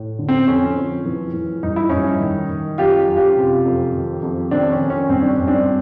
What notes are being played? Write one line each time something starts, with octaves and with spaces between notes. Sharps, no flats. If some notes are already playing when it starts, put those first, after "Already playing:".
Already playing: A2
D3
C4
F2 C#4
F2
E3
E3
G2 D#4
E4
G2 C#4 D#4
D#3
D#3
F#2 F4 G4
F#2
F4 G4
C3
F2
D#3
F2
D#3 C4 D4
C#4
D#3
C#4
G2 C4
D4
C#4
G2
C4 D4